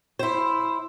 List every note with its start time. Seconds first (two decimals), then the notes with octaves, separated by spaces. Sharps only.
0.19 E4 C5